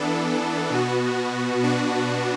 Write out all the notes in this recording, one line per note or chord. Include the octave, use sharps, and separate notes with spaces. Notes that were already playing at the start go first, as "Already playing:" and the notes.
Already playing: E3 B3 D4 A4
B2 B3 F#4
B2 B3 D4 F#4